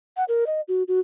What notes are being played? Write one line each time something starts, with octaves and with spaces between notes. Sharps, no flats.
F#5
A#4
D#5
F#4
F#4